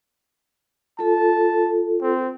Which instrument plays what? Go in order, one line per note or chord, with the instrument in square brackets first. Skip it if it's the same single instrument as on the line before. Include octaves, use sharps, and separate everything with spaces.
[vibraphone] F4 A4 [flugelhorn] A5
[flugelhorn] C4